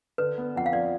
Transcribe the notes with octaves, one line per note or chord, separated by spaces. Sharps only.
D3 B4
B3
F2 F#5
F5
F3 D5